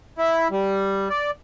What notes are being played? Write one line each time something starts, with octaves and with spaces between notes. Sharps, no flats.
E4
G3
D5